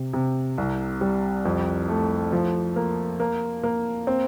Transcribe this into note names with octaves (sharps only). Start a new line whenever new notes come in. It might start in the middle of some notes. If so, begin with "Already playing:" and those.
Already playing: C3
C3
C2
G3
F2
A3
F3
A#3
A#3
A#3
C4